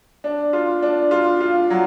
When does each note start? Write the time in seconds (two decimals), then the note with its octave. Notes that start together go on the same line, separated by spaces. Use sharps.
0.24 D4
0.53 F4
0.82 D4
1.11 F4
1.40 F4
1.70 F#3